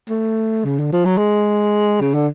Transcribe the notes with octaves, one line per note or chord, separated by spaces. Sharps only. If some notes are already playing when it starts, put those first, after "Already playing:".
A3
C#3
D3
F3
F#3
G#3
C#3
D3